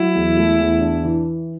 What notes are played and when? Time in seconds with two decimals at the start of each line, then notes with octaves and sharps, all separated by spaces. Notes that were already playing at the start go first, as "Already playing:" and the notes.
Already playing: F#3 E4
0.15 E2
0.37 A3
0.59 E2
0.81 D4
1.04 E3